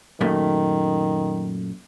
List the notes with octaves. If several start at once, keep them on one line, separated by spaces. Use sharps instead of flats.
F#2 A#2 D#3 A3